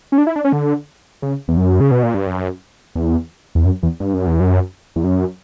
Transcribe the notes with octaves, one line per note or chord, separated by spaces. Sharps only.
C#4
D4
E4
D4
C#4
D3
C#3
E2
F#2
C#3
B2
A#2
G2
F#2
E2
E2
F#2
E2
G2
F#2
E2
F#2
E2
F#2